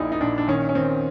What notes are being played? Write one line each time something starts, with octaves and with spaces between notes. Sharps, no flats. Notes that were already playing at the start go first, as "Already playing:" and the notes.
Already playing: A#1 A#2 D#4 E4
D#4
A#2 D4
D4
D#3 C#4
C#4
D#3 C4